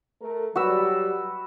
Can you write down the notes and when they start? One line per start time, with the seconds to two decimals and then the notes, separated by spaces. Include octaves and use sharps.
0.21 A3 A4 A#4
0.56 F#3 G3 F#4 B4 E6